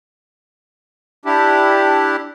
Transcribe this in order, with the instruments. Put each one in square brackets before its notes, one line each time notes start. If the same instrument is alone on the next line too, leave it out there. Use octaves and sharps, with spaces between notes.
[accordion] D4 E4 G4